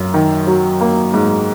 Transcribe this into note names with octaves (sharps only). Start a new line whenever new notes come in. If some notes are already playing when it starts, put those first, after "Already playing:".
Already playing: F#2
D#3
F#3
A#3
G#2